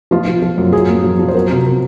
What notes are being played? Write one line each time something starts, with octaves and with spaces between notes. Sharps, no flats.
F3 F4
F3
F3
F#2
F#2 G#4
A#3
F3
F3
C5
F#3 A#4
C3
C3